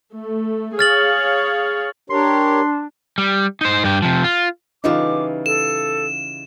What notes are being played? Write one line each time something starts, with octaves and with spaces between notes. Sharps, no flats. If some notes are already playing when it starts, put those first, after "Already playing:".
A3
G#4 C#5 F5 F6 A6 F#7
D4 G4 A#4 C#5 C6
G3
D#4 C5
G2 G4
C3 F3
F4
C#3 E3 G3 D#4 F4 D6
A4 E7